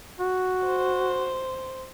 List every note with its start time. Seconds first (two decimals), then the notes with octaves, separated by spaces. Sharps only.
0.19 F#4
0.65 C5